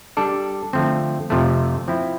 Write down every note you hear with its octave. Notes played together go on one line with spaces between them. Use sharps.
G3 D4 A4 D5
D3 F3 A3 C4
F2 C3 F3 A3
F3 C4 E4